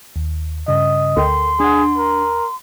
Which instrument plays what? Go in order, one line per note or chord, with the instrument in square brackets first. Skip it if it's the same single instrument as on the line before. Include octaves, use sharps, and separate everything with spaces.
[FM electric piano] D#2
[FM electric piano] G2 C#3 [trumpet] D#5
[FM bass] D2 [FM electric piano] A4 A#4 G5 [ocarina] C6
[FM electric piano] D4 F#5 [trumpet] G#4
[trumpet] A#4